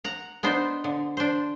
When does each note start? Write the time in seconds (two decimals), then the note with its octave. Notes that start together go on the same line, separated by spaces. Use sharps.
0.04 F#5 A#5
0.43 B3 D4 D#4 C5
0.84 D3
1.17 D4 C5